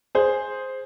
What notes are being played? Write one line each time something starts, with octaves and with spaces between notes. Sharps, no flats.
G#4 C5